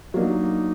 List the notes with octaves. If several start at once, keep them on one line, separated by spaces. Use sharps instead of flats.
F#3 A#3 D4 D#4